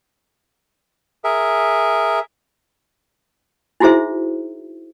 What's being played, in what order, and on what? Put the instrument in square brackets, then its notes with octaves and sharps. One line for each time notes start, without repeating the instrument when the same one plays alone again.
[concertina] G#4 A#4 E5
[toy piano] D#4 E4 F#4 G#4 C5 E5